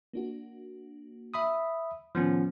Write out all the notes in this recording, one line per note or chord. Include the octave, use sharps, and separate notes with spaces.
A#3 D4 F#4
E5 B5 D#6
A2 D#3 F3 B3 C#4